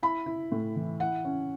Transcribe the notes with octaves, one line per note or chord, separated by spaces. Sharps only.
E4 B5
E4
A2
E3
E4 F#5
C#4